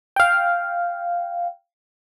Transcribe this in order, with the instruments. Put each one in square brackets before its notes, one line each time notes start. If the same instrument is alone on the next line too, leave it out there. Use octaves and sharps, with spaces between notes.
[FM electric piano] F5 G5